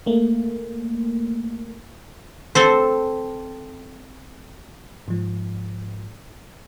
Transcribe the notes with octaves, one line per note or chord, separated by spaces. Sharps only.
A3 A#3
C4 A4 C5
G#2 F3